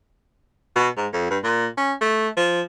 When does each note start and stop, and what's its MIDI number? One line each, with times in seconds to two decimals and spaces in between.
0.76 0.89 47
0.97 1.07 44
1.13 1.29 41
1.30 1.39 43
1.44 1.67 46
1.78 1.93 61
2.01 2.29 57
2.37 2.62 53